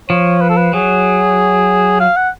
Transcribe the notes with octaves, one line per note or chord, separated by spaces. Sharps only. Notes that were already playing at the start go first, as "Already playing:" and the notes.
F3 C#5
B4
A4
B4
F#3 G#4
F5
F#5